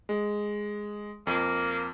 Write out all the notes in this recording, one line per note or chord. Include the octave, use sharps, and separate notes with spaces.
G#3
F2 A#3